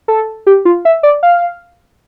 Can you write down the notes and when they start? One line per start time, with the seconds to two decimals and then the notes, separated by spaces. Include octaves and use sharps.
0.08 A4
0.47 G4
0.65 F4
0.85 E5
1.03 D5
1.23 F5